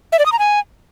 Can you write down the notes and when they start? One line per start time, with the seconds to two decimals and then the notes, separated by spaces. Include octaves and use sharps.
0.12 E5
0.19 D5
0.26 D#6
0.32 A#5
0.39 G#5